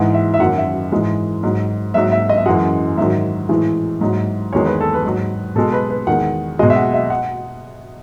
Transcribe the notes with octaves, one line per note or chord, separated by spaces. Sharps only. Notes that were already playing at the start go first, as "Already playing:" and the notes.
Already playing: G#2 E3 G#3 F#5
E5
E5
F#2 D#3 F#3 F#5
E5
G#2 E3 G#3
G#2 F#3
G#2 F#3 E5
E5
D#5
E5
F#2 E3 G#3 F#5
G#2 D#3 F#3 E5
A2 E3 G#3
G#2 F#3
E2 D#3 G#3 C#5
B4
A4
B4
G#2 F#3
B2 G#3 A4
B4
B4
E2 D#3 G#3 F#5
B2 G#3 D#5
E5
F#5
E5
F#5